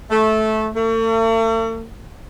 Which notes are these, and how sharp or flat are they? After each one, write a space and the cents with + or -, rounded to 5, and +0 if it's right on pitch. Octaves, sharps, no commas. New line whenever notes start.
A3 -15
A3 +45